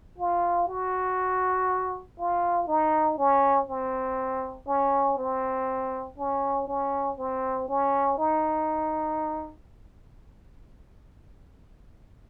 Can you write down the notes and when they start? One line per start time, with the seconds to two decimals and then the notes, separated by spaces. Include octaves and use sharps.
0.18 F4
0.68 F#4
2.19 F4
2.68 D#4
3.18 C#4
3.69 C4
4.67 C#4
5.18 C4
6.18 C#4
6.67 C#4
7.18 C4
7.68 C#4
8.18 D#4